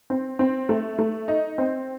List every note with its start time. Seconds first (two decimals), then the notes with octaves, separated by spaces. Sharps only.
0.10 C4
0.39 C4
0.69 A3
0.98 A3
1.28 D#4
1.58 C4